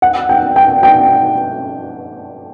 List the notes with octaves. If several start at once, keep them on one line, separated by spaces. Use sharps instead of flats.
F#5
G5
G5
G5